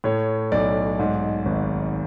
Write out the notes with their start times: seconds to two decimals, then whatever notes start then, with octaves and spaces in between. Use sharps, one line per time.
0.04 A2 C#5
0.52 B1 D5
0.99 G#2
1.46 G#1